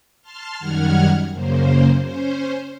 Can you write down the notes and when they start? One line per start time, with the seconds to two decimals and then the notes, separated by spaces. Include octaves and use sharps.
0.22 A5 C6 F6
0.59 F#2 D#3 G3 F#5 F6 G#6
1.33 F#2 C#3 A#3 C5
2.02 C#4 C5